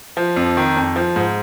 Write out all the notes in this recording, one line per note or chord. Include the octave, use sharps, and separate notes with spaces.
F3
F2
D#3
F2
F3
G#2